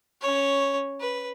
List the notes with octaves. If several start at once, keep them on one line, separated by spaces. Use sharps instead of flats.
C#4 C#5
B4